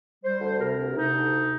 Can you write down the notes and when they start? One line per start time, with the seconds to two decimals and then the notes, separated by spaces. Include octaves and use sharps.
0.23 G3 C5
0.41 D2
0.59 C3 A#4
0.77 D2
0.95 C3 D#4
1.13 D2
1.31 C3